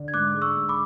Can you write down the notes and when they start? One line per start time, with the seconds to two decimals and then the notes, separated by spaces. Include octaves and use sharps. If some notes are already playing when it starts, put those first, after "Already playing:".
Already playing: D3
0.08 G#6
0.14 G#2 D6 F#6
0.35 G#3
0.42 C#6 E6
0.56 G#2
0.69 B5 D6